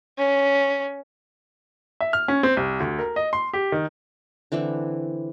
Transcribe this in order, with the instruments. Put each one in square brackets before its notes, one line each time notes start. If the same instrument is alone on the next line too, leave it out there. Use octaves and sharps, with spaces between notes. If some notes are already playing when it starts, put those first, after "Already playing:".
[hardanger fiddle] C#4
[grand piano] E5
F6
C#4
C4
C2
D2
A#4
D#5
C6
G4
D#3
[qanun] D3 E3 C4 E4